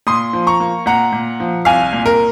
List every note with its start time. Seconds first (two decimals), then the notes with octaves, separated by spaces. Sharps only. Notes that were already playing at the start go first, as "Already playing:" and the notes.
0.07 A#2 C6 D#6
0.33 F3
0.47 A#5 C#6
0.60 A#3
0.86 A#2 F#5 A#5
1.13 A#2
1.40 F3
1.65 C2 F5 G#5
1.93 A#2
2.06 A#4